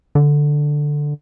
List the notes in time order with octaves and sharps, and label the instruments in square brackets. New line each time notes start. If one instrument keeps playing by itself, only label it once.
[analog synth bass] D3